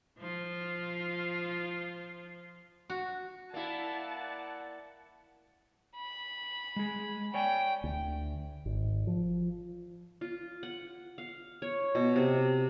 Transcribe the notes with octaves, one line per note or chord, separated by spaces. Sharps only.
F3 F4
F#4
A#3 E4 D5 F#5 A5
B5
G#3 G#4
C#5 D5 G5 G#5
D2
G#1
F3
F4
F#5
F5
C#5
B2
C3